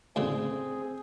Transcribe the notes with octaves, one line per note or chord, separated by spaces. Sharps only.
D2 A2 C#3 C4 G#4